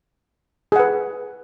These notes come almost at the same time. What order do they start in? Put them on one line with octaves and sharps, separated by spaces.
G#4 F#5 B4